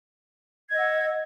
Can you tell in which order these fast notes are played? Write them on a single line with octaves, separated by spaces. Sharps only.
G#6 D#5 E6 F#5